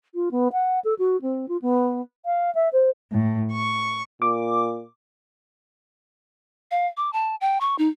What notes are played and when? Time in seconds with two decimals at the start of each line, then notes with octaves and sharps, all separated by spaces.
0.15 F4
0.31 B3
0.53 F#5
0.84 A4
0.99 F#4
1.22 C4
1.48 F4
1.62 B3
2.26 F5
2.55 E5
2.73 C5
3.11 A2
3.53 C#6
4.22 A#2 D6
6.71 F5
6.97 D6
7.13 A5
7.41 G5
7.61 C#6
7.78 D#4